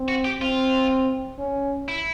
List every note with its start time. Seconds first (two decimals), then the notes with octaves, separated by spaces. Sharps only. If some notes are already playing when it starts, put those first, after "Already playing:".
Already playing: C4
0.08 F#4
0.25 G4
0.41 C4 F4
1.39 C#4
1.88 E4